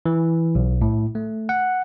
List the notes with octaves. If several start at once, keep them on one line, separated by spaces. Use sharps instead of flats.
E3
B1
A2
A3
F#5